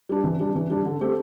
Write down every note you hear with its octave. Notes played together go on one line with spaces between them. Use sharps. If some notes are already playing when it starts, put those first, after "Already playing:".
G3 D4
E3
G3 D4
E3
G3 D4
D3
A3 C4 G4